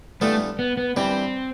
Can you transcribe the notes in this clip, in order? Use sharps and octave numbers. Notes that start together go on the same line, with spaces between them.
G2 E3 A3 B3 F4
B3
B3
G2 E3 G3 C4